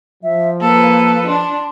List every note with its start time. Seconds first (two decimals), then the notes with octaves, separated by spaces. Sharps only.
0.23 F3 E5
0.61 A#3 A4 B4
1.27 D4 C6